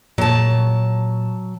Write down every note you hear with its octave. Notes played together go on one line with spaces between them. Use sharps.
A#2 F#3 A5